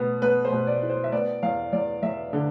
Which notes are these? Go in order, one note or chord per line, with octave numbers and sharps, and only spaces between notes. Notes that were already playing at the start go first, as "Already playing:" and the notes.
Already playing: B2 B3
B3 B4
C5
B2
D5
E4
C5
E5
B3 D5
E2 F5
E2 D5
E2 E5
D3